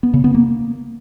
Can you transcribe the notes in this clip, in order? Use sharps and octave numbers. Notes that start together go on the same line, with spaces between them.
B3
C#3
B3
A#3